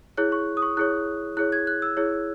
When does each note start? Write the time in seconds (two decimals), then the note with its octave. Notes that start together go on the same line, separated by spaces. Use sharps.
0.17 E4 G#4 C#5 F#6
0.32 C#6
0.57 D#6
0.62 C#6
0.77 E4 G#4 C#5 F#6
1.37 E4 G#4 C#5 F#6
1.52 G#6
1.67 F#6
1.82 E6
1.97 E4 G#4 C#5